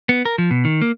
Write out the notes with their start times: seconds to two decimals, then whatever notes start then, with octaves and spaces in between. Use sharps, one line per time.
0.09 B3
0.25 A#4
0.38 F3
0.51 B2
0.65 D#3
0.82 A#3